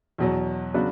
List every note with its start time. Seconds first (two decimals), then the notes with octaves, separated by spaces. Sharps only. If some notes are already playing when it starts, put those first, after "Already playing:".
0.18 E2 B2 F#3
0.74 C#3 F#3 B3 D4 F#4